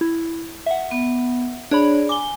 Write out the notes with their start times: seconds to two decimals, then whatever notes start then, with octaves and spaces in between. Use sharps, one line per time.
0.01 E4
0.66 E5 F#5
0.91 B3
1.71 D4 G#4 C#5 D5 B5
2.09 G#5 D6 G7